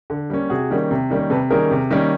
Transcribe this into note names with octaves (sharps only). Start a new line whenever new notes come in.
D3
G3 A#3 C#4
C3 F#4 G#4
D#3 G3 A#3 C#4
C3
D#3 G3 A#3 C#4
C3 A4 B4
D#3 G3 A#3 C#4 G#4 A#4
C3
D#3 G3 A#3 C#4